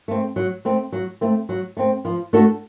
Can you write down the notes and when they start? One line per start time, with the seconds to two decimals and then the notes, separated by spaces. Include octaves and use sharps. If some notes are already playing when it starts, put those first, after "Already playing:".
0.08 A3 C4
0.36 F#3
0.65 A3 C4
0.92 F#3
1.21 A3 C4
1.49 F#3
1.77 A3 C4
2.05 F3
2.33 A3 D4 F#4 A4